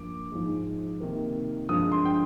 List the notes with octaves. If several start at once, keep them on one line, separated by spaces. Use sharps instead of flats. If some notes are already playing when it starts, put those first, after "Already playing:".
Already playing: G2 F3 A#3 D6
G#2 F3 G#3
C3 D#3 A#3
G2 D3 F3 G#3 D#6
C6
G5